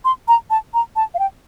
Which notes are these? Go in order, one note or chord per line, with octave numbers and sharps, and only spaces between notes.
C6
A#5
A5
A#5
A5
F5
G5